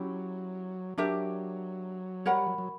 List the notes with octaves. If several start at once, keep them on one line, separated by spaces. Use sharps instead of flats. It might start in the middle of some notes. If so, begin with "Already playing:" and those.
Already playing: F#3 C#4 E4 G4
F#3 D4 G4 A#4 E5
G3 A#4 C#5 F#5 B5
F#3
F#3